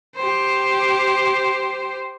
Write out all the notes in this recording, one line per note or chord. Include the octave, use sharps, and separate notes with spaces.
G4 C5